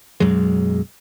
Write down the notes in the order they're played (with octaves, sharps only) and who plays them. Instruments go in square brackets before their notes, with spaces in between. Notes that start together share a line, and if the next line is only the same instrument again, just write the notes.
[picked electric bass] B1 F#2 F#3 G#3